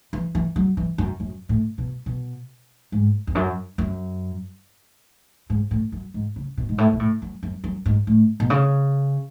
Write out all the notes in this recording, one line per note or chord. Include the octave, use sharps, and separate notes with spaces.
E3
E3
F#3
E3
F#2
F#2
A2
B2
B2
G#2
E2
F#2
F#2
G#2
A2
F#2
G#2
C#3
B2
G#2
A2
B2
A2
F#2
F#2
F#2
G#2
A2
B2
C#3